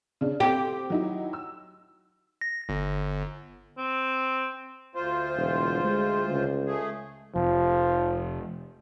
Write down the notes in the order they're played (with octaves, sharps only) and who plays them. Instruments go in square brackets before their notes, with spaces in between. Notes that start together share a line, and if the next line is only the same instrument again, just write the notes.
[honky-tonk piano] C#3 D4
[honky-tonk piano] C4 [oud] G4
[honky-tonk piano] F#3 D#4 E4
E6
[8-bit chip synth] A#6
G1
[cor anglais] C4
[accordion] D2 F4 C5
[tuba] E1
G#3
C#2
[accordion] A3 G#4
[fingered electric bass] F1 [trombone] F3